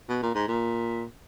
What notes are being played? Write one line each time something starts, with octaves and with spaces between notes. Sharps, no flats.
B2
A#2
G#2
A#2